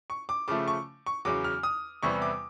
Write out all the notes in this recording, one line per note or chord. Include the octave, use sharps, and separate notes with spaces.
C#6
D6
C#3 F3 A3 D6
C#6
C#6
E2 C#3 F#3 D6
F6
D#6
E2 C3 E3 G3 B3 C#6
D6